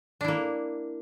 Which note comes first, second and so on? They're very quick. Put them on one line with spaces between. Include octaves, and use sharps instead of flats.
D4 E4 A#3